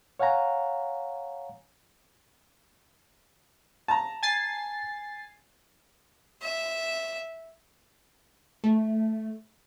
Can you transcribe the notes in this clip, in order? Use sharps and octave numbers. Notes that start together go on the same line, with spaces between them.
C#5 F5 F#5 G#5 A#5
A5 A#5
G#5 A6 C7
E5
A3